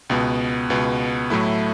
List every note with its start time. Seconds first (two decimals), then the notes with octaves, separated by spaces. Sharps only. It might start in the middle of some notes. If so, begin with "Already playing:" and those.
0.10 C#2 B2 B3
0.70 C#2 B2 B3
1.30 A2 F#3 A3 E4